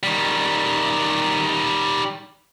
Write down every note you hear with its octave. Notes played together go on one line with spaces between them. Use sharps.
D#3 G3